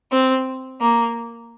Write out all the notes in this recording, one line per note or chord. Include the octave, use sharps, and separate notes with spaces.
C4
A#3